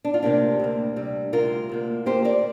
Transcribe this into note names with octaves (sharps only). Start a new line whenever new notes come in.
D4
F4
D2 C3 A#3 D4 G4
D2 C3 A#3
D2 C3 G3
D2 C3 G3 F4 A#4
D2 C3 A#3
D2 C3 A#3 G4 C5
A#4 D5